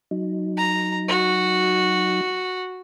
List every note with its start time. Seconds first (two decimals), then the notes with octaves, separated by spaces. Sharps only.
0.11 F#3 D#4
0.57 A#5
1.08 F#4